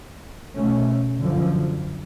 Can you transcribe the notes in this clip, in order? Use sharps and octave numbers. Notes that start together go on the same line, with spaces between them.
B2 A3 C#4
F#2 D3 F3